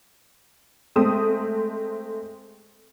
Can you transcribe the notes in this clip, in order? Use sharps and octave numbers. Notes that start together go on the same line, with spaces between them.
G#3 A3 C4 D#6